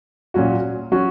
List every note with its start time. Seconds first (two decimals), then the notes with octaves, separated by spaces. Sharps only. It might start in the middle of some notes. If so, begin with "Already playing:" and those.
0.34 A#2 F#3 C#4 F#4
0.92 F#3 C#4 F#4